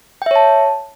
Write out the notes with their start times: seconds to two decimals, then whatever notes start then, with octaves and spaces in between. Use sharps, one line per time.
0.22 G5
0.26 E5
0.31 C#5
0.36 A5